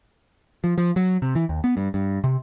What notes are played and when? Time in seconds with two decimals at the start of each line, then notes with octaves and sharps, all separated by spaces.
0.64 F3
0.78 F3
0.96 F#3
1.22 C3
1.35 E3
1.49 D#2
1.64 B3
1.77 G2
1.94 G2
2.24 C3